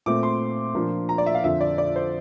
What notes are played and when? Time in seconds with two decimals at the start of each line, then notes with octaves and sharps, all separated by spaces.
0.06 A#2 A3 C4 D6
0.23 C6
0.74 A#2 F3 A#3 D4
1.09 A#5
1.18 D5
1.26 E5
1.35 F5
1.43 F2 D3 F3 E5
1.61 D5
1.78 D5
1.96 C5